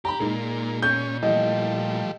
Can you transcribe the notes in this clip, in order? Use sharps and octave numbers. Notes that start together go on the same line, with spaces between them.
G4 A#5 B5
A#2 G#3 A#3 D#4
C#4 G6
E3 F3 G3 A3 D#5